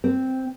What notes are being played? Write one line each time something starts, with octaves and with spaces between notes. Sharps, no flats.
C4